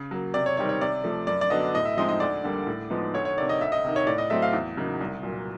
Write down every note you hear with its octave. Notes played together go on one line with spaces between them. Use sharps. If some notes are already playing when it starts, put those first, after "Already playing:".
Already playing: C#3
F#3 A#3
C3 D5
C#5
D#3 G3 C4 D#4 C#5
C#5
C3 D5
F3 A3
F#2 D5
D5
D3 F#3 B3 D4 D#5
A2 D#5
E5
F3 G#3 C4 D#4 D#5
D#5
D2 D5
D3 G3 A#3
A2
F3 G#3 B3 D#4
D2 C#5
C#5
C3 D#3 D5
D#5
D2 E5
D#5
C3 D#3
C#5
A2 D5
D#5
F#3 A3 C4 E5
F5
E2
C#3 F#3 A#3 D#4
C2
A#2 F#3